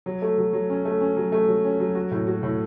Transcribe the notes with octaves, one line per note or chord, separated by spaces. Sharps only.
F#3
A3
F#3
F#3
C#4
A3
C#4
F#3
A3
F#3
C#4
F#3
F#4
A2
F#4
A2